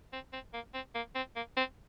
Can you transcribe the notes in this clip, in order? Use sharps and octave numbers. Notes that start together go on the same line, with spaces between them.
C4
C4
A#3
C4
A#3
C4
A#3
C4